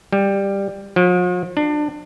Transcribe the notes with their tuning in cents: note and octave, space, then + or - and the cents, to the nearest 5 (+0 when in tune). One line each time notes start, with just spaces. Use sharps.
G3 +10
F3 +45
D4 +25